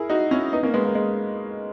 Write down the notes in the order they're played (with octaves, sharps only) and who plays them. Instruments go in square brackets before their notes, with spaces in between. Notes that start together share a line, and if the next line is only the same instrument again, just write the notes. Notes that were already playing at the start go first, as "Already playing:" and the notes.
Already playing: [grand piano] E4 G#4 A#4
D#4 F#4
C#4 E4
B3 D#4
A#3 C#4
G#3 B3
A#3
G#3